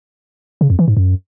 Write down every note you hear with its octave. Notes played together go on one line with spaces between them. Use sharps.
C#3
F2
E3
G#2
F#2